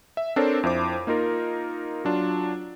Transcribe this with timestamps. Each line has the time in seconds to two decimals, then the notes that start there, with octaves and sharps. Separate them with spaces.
0.17 E5
0.36 C4 D4 A4 A#4 C5 C#5
0.63 F2 E4 C5 D6
1.07 A#3 D#4 F4 A#4
2.05 F#3 D4 F4